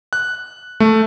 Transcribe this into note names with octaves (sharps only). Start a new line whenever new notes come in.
F#6
A3